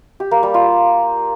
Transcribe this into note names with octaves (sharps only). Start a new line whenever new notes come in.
G4
A#3
G3
F4